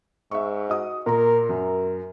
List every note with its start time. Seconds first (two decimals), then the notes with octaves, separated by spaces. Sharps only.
0.31 G#2 E5 C#6
0.69 F#4 D#5 D#6
1.06 A#2 A#4 A#5
1.49 F#2 A#4